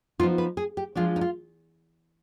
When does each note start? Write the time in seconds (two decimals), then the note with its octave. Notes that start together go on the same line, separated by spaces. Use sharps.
0.19 F3 B3 D#4 F4
0.38 B4
0.57 G#4
0.77 G4
0.95 F3 G#3 D4 F4
1.16 D#4
1.21 F4